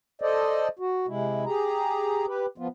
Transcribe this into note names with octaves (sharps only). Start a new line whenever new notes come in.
A4 C5 D5 D#5
F#4
C3 G#3 E4
G4 G#4 A#5
G4 B4
F3 B3 F4